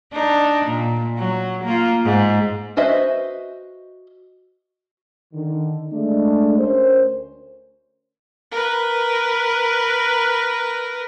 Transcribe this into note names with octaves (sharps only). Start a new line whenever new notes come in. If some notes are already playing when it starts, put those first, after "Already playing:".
D4 D#4
A#2
F#3
A#3 F4
G#2
F#4 B4 C5 D#5 E5
D3 D#3
G#3 A3 D4
D2 C#4 A#4 C5
A#4 B4